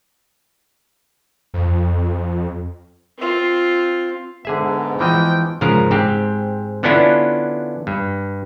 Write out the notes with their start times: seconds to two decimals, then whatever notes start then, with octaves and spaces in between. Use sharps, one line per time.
1.54 F2
3.19 C4 F4
4.45 G#2 D3 B3 G#4 E5
5.00 E3 F3 D#5 G5
5.61 G#2 C#3 F3 A#4
5.91 G#2 C4 G4
6.83 D3 B3 C#4 D4 E4 F4
7.87 G2